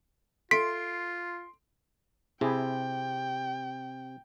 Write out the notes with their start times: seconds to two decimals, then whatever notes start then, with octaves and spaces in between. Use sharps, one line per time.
0.51 F4 A4 E5 C6 B6 D7
2.41 C3 E4 G#4 G5